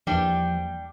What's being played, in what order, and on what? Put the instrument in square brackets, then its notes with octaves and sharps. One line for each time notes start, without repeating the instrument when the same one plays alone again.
[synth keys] E2 E3 A#3 [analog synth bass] F3 [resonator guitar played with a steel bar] G3 D4 G4